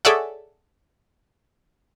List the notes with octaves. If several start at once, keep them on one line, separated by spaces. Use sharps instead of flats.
G#4 A4 C#5 D5 E5 F#5